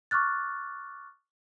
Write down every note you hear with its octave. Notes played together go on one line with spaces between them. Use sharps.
C#6 D6 F6 F#6 A6